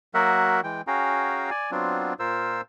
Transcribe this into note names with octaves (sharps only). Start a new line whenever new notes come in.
F#3 A#3 F#4 A#4 E5 F#5
E3 G#3 G5
C#4 F#4 G#4 F5 G5 A#5
D5 G#5
F#3 B3 C4 D4 F4
A#2 F4 A#4 C5 E6